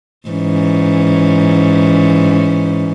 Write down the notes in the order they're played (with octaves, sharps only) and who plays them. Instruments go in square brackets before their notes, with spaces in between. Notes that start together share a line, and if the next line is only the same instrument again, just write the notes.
[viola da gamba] G#2 E3 C#4